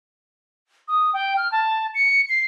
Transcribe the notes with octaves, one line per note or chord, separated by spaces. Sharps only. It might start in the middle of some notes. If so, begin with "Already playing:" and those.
D#6
G5
F6
A5
C#7
C7